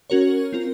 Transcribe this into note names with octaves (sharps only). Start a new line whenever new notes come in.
C#4 F#4 A#4 C#5
C4 F4 A#4